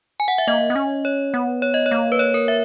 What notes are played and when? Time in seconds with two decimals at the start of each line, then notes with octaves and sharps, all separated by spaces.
0.20 G#5
0.28 F#5
0.38 E5
0.47 A#3 D#5
0.70 B3
0.75 C#4
1.05 C#5
1.34 B3
1.62 C#5
1.74 D#5
1.86 C#5
1.91 A#3
2.12 B4
2.19 C#5
2.34 A#4
2.48 E5